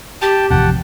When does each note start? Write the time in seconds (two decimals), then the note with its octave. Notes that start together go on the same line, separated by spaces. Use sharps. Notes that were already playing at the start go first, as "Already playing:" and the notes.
0.22 G4 G5 A5
0.50 A1 F2 C3 F#5 G5 A5